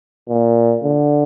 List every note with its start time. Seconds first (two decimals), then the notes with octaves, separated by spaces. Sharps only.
0.29 A#2
0.84 D3